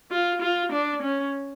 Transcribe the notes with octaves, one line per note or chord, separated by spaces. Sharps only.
F4
F4
D4
C#4